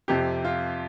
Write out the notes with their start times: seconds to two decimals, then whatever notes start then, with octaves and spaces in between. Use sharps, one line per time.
0.08 F2 C3 F3 G4
0.44 F4